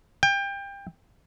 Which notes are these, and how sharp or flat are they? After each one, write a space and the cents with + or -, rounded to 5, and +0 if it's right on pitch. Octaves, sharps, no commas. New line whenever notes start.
G5 +25